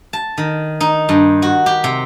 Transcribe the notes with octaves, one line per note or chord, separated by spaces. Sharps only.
A5
D#3
D#4
G2
F#4
G4
C3